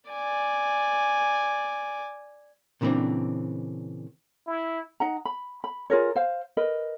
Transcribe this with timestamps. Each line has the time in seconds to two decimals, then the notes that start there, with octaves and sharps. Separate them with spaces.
0.11 D5 G#5
2.81 A#2 C#3 E3 G3 C4 D4
4.47 E4
5.00 D#4 F#5 A#5
5.25 B5
5.64 B5
5.90 F4 G#4 A#4 C#5
6.16 C5 F5
6.57 A#4 B4 D#5